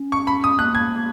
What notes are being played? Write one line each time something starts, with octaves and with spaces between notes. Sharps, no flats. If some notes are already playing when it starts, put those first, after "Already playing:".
Already playing: C#4
C#6
B5
D#6
A#3 F#6
G#6